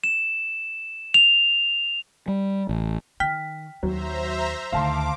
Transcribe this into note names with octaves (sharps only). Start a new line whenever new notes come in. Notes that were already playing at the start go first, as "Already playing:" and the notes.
E7
F7
G3
A1
D#3 G5 F6 B6
D#2 F#3 C5 E5 A#5
D2 D#3 F5 A5 C6 D6